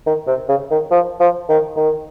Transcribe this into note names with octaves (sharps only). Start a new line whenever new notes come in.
D#3
C3
C#3
D#3
F3
F3
D#3
D#3